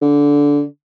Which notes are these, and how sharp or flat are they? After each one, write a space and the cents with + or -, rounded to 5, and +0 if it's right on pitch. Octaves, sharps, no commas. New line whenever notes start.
D3 -20